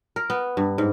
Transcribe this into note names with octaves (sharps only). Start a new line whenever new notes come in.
A#4
B3
G2
G#2